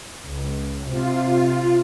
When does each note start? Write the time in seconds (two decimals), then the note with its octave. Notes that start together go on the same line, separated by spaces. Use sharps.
0.24 C#2
0.91 C3 F4